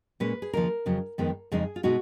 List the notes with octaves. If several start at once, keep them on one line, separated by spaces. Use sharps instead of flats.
A#2 G#3 C#4 B4
G#4
D#2 C#3 F3 A#4
F2 C#3 F#3
F2 D#3 G#3 B3
F2 C#3 G#3 D#4 G#4
F4
B2 G#3 D#4 F#4